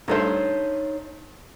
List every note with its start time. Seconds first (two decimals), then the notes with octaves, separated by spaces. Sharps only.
0.08 G2 A3 D#4 C5 C#5 E5